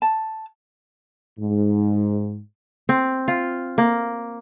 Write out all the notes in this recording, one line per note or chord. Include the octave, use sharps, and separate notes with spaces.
A5
G#2
C4
F4
A#3